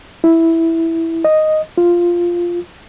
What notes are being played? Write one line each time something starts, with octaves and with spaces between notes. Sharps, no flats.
E4
D#5
F4